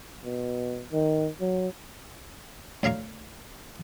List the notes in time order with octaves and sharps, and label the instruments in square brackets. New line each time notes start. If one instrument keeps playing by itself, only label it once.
[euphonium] B2
D#3
F#3
[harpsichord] D2 C#5 F5 A#5 C#6